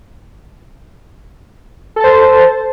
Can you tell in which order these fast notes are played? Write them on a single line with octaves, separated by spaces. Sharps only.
A4 A5 C5